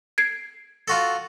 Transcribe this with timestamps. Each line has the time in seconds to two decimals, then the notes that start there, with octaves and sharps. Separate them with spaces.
0.18 G#6 C7 D7
0.88 F4 F#4 A4